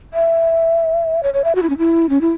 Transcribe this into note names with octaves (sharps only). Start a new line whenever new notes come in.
E5
C#5
C#5
E5
F#4
E4
C#4
E4
C#4
E4